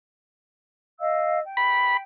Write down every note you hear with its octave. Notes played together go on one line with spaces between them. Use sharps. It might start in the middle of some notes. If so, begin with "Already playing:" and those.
D#5 F5 E6
G5
B5